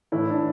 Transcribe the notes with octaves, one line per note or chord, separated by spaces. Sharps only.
A2 E3 E4
D4